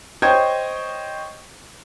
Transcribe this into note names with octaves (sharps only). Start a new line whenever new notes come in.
C5 C#5 D#5 G5 G#6